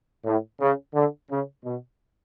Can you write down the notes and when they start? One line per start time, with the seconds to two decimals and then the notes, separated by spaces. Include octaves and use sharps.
0.25 A2
0.60 C#3
0.95 D3
1.31 C#3
1.65 B2